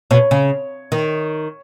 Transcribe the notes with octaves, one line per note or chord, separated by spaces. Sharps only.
B2 C#5
C#3
D#3